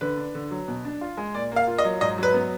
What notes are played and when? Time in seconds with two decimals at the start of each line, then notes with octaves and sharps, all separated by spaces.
0.01 D3 B4
0.17 D4
0.35 D3
0.51 F#3
0.68 B2
0.85 D4
1.01 F4
1.17 G#3
1.34 A#2 D5
1.52 A#3 F5
1.67 F4
1.78 D#5
1.85 F#3
2.01 G#2 D#5
2.18 F#3 B4
2.34 B3